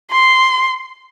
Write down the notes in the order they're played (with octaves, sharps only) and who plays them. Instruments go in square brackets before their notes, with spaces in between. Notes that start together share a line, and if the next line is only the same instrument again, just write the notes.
[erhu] C6